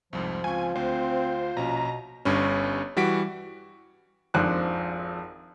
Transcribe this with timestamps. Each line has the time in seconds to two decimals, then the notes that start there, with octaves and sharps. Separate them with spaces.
0.13 C2 F2 G#2 F3
0.44 C#2 C4 F4 G#5 C#6
0.75 D2 C4 C5
1.57 A#1 B2 C#4 A#5
2.25 G1 G2 C#4
2.96 E3 G3 F#4 C#6 B6 D7
4.34 G#1 F2 D4 C5 F#6